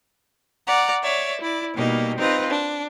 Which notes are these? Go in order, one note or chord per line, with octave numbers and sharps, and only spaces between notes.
D5 F#5 A#5
C#5 D5 E5
E4 D5
B2 G3 A#3 D#4
C4 D#4 F4 B4
D4